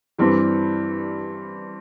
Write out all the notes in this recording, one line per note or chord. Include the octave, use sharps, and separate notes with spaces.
G2 E3 G3 C4